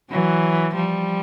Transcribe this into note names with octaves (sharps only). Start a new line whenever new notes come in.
E3 F#3
F3 G3